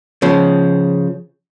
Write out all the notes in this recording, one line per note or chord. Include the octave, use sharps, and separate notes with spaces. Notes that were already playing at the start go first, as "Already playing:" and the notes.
C#3 F3